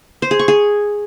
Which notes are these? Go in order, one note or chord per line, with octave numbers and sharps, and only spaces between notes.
C5
G#4
C#6
G#4